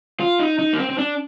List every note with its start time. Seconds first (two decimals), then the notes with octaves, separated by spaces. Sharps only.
0.20 F4
0.40 D#4
0.59 D#4
0.73 A#3
0.78 C4
0.90 C4
0.98 D4